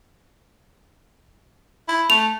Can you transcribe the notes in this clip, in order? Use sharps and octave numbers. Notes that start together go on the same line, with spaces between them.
E4
A3 F7